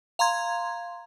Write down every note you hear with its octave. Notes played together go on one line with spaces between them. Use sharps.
F5 A#5 C6 G#6